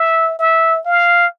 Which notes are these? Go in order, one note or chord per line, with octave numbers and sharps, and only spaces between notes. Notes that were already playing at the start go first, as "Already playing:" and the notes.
Already playing: E5
E5
F5